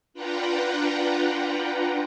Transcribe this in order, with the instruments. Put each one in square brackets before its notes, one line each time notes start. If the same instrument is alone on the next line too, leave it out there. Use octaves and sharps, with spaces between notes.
[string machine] D4 F4 B4 F#5 G5 A#5